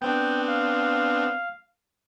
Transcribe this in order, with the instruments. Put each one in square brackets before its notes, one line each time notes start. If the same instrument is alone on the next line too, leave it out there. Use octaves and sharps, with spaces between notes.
[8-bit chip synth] B3 C4 D4 [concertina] G5
[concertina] F5